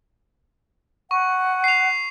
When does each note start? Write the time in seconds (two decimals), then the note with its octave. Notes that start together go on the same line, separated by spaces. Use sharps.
1.11 F#5 C#6
1.64 C7 F7